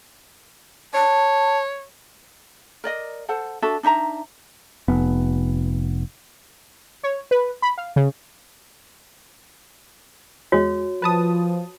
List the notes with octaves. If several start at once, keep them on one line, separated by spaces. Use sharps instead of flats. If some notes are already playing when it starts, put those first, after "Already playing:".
C#5 A5
A#4 D5 D#5
A4 C5 F#5 A5
D4 F#4 A4 E5
D4 D#4 E5 A#5
F1 B3
C#5
B4
B5
F5
C#3
E2 G#3 F#4 C#5
F3 B4 A5 D#6